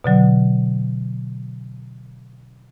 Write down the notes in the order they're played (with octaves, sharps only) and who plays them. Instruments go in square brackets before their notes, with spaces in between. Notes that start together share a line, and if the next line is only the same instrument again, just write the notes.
[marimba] B2 D3 F#3